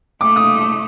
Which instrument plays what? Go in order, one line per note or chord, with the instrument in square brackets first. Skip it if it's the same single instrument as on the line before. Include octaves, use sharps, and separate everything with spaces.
[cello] A3 [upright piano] D6
[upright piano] D#6